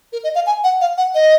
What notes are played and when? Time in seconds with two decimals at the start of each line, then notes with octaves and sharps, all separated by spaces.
0.13 A#4
0.24 D#5
0.35 F5
0.46 G#5
0.64 F#5
0.81 F5
0.97 F#5
1.15 D#5